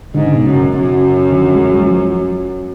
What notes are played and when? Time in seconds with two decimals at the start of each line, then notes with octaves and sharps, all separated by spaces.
0.15 G#2 D3
0.24 C#3
0.34 B2
0.44 F#2 C#3
0.77 F#2
1.32 D3
1.40 F3
1.55 G#3
1.71 F#3
1.82 F#3
1.86 F3